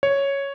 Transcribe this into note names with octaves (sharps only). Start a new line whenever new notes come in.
C#5